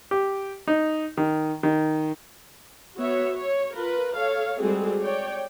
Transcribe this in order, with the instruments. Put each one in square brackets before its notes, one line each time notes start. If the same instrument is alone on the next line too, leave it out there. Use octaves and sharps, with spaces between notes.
[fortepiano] G4
D#4
D#3
D#3
[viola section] B3 F#4 C#5 E5
C#5
F4 A#4 B4
A4 C#5 F5
G3 G#3 C4 F#4 G#4 A4
C#5 D5 G5